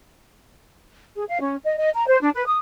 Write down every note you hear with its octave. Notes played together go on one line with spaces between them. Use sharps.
G#4
F5
C#4
D#5
D#5
A#5
C5
D4
B4
D#6